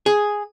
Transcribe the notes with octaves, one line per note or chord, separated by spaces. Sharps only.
G#4